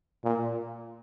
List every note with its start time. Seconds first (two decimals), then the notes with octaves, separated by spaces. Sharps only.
0.24 A#2